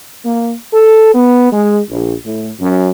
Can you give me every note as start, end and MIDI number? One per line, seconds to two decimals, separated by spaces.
0.25 0.55 58
0.73 1.13 69
1.14 1.49 59
1.52 1.79 56
1.90 2.14 34
2.25 2.50 45
2.60 2.90 42